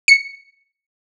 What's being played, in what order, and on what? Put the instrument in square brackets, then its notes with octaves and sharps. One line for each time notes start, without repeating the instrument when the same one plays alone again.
[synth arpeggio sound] C#7